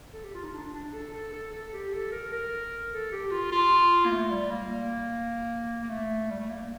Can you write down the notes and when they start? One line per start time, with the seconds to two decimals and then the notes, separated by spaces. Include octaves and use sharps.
0.13 A4
0.24 G4
0.34 F4
0.44 D#4
0.54 D4
0.74 D4
0.94 A4
1.14 A4
1.33 A4
1.53 A4
1.73 G4
1.93 A4
2.12 A#4
2.32 A#4
2.92 A4
3.12 G4
3.31 F4
3.52 F4
4.06 A#3
4.11 A3
4.31 G3
4.51 A#3
5.82 A#3
5.90 A3
6.31 G3
6.40 A3
6.50 A#3